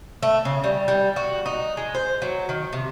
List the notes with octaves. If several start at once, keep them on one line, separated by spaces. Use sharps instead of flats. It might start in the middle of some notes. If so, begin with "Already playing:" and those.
A3
C#3
G3
G3
F#4
D#4
G#3
C5
F#3
D#3
C3